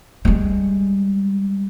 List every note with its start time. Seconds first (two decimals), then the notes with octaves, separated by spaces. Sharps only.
0.25 G3 G#3